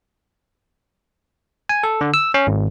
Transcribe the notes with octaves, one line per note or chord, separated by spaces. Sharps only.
G#5
A4
D3
E6
C#4
G#1